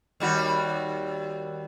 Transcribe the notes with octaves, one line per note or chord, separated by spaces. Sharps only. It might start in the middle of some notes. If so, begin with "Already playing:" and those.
D#2 G3 F#4